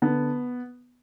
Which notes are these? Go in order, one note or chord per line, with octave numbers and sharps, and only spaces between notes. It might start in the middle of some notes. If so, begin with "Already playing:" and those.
D3 B3